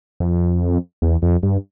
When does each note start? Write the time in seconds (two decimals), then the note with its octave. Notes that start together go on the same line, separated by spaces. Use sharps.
0.20 F2
1.02 E2
1.22 F2
1.43 G2